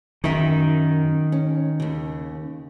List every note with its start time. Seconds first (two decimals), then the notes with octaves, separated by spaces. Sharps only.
0.24 F#2 D#3 C#4 E5
1.32 C#4
1.80 D#2 C#3